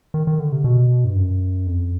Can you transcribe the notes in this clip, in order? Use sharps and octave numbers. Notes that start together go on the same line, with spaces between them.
D#3
D#3
D3
C3
B2
G2
F#2
F2